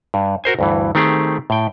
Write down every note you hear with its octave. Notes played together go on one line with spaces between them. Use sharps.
G2
F#4 A#4 C5 G#5
D2 G2 E3
D#3 A3 C4 G4 G#4
A2 G5